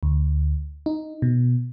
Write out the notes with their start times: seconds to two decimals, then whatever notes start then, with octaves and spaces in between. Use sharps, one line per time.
0.03 D2
0.86 D#4
1.22 B2